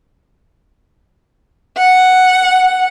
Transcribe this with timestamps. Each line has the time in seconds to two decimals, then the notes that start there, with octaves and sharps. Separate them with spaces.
1.78 F#5